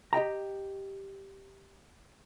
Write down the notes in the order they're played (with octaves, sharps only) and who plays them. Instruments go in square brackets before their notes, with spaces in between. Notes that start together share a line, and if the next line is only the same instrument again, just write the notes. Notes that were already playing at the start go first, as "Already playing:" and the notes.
[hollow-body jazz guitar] G4 D#5 G5 A#5